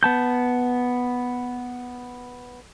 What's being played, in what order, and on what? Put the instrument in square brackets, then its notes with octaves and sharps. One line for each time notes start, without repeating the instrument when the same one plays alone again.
[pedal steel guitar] B3 A5 G6